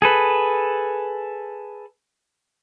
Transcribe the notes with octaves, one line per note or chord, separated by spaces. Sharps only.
G#4 A4 B4